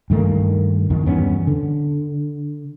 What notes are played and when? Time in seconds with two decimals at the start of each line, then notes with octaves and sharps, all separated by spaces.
0.10 G2 D#3 A3 A#3
0.90 E2 D#3
1.06 E2 G2 B3 C#4
1.47 D3